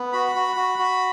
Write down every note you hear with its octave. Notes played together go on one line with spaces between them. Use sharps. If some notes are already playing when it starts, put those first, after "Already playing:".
Already playing: B3
F#4 B5
F#4
F#4
F#4